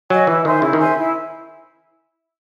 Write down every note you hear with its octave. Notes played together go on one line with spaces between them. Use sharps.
F#3 D#5 G#5
E3 E4
D#3 C5 E5 G#5
C#3 E4
D#3
C5 E5 G#5
E4